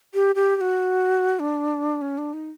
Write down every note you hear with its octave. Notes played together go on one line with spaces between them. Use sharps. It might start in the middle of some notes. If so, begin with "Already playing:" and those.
G4
G4
G4
F#4
D4
C#4
D4
D#4